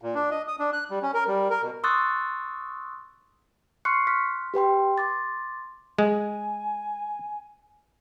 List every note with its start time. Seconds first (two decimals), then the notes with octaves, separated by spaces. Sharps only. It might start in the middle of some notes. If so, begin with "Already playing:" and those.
0.02 A#2
0.15 D4
0.31 D#5
0.48 D#6
0.59 D4
0.73 F#6
0.91 G3
1.03 C#4
1.14 A#4
1.28 G3
1.50 A#4
1.62 B2
1.84 C6 C#6 D#6 E6 F#6 A6
3.85 C6 C#6 F6 F#6 C7 C#7
4.07 C6 F6 F#6 B6
4.54 G4 B4 G5 C6
4.98 C6 D6 A6
5.98 G#3 G#5